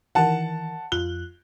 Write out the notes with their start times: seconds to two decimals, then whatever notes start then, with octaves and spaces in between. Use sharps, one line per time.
0.15 D#3 E3 A#4 F#5 A5
0.92 F2 F4 F#6 G7